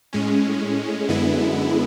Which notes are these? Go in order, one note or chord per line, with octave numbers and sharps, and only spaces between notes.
A2 G#3 C#4
F#2 D3 G#3 B3 E4